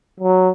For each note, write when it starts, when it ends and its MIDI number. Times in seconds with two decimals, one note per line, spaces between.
0.20 0.50 54